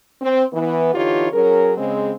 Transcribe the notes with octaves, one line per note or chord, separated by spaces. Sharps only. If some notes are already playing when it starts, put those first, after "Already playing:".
C4
E3 B3
D3 E3 D#4 F4 G4 C#5
F#3 C#4 G#4 A#4
C#3 G#3 C4